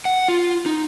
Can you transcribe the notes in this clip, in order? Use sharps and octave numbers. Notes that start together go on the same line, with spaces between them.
F#5
F4
D#4